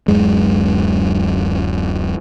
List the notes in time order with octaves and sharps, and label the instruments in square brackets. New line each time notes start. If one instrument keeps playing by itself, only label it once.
[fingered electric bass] D1 F#2 G#3